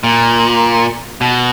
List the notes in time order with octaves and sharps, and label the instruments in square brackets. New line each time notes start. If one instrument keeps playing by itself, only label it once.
[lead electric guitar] A#2
B2